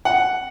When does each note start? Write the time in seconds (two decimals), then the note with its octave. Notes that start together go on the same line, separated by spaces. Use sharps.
0.05 F#5